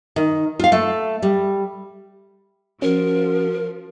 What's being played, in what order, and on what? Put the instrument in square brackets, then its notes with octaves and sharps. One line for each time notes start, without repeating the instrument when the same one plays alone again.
[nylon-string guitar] D#3
F4 F5
A3
G3
[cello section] F3 [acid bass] C#4 [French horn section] F#4 [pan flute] A#4